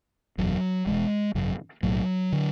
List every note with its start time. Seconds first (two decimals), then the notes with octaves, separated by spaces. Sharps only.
0.38 F#1 E2 B2 F#3
0.86 E1 E2 B2 G#3
1.35 G#1 F#2 C#3
1.83 B1 A2 F#3
2.32 D3